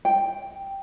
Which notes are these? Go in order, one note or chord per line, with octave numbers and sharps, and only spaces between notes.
G5